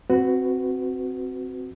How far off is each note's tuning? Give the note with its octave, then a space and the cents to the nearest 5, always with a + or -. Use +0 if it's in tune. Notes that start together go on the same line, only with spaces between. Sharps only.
C4 +0 F#4 +0 B4 +25